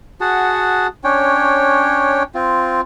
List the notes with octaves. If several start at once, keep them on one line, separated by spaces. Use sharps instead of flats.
F#4 G#4 F#5 A5
C#4 D4 C#5 G5
C4 F4